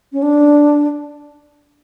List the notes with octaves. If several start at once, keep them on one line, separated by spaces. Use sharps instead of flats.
C#4
D4